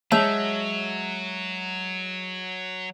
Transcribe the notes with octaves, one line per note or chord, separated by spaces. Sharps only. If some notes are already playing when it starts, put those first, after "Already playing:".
F#3 G#3 C#5 E5 A5